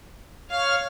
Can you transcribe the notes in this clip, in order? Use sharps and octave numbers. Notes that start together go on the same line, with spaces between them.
C#5 F5 F6